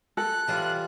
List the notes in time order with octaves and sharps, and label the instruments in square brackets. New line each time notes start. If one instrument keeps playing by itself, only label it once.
[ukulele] A4 [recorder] F#6
[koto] E3 G3 F4